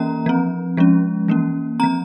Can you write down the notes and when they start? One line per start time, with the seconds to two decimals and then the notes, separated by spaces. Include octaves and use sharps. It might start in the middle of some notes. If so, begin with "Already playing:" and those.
Already playing: E3 A#3 C#4 A#5
0.26 F3 C4
0.77 F3 G#3 C#4
1.28 E3 A#3 C#4
1.80 F3 C4 A#5